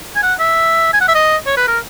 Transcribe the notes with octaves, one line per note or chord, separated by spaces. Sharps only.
G#5
F#5
E5
G#5
F#5
E5
D#5
C#5
B4
A#4